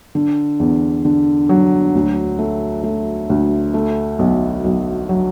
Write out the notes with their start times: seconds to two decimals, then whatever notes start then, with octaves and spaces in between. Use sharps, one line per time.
0.15 D3
0.60 E2
1.05 D3
1.49 F#3
1.95 D2
2.39 A3
2.84 A3
3.30 D2
3.74 A3
4.19 B1
4.64 B1
5.09 F#3